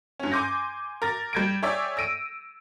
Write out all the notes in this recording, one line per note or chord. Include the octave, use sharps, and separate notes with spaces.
G2 C#4
G#5 C6 D6 G6 A#6
A#4 A6 A#6
G3 G6 G#6 A#6 D7
G#4 C#5 D5 E5 G5
E6 A#6 D7 D#7